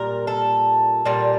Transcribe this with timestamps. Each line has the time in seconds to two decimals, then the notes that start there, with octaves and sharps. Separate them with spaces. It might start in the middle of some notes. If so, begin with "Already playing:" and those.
Already playing: A#2 G3 A#4
0.27 A4
1.05 A#2 G3